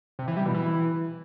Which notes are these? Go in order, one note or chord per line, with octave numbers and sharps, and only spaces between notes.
C3
E3
G3
B2
E3